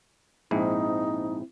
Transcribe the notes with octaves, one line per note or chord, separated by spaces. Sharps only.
A#1 G#2 C4 D#4 E4